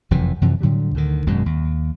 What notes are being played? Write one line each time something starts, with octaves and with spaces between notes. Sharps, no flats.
F#1 F2 C3 E3
F#2 C3 E3 F3
A2 D3 F#3 G3
D2 D3 D#3
G#1 F#2 B2 G#3
D#2